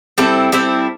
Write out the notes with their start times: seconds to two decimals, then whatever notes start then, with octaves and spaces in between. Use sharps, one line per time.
0.18 G3 C4 E4 A4
0.52 G3 C4 E4 A4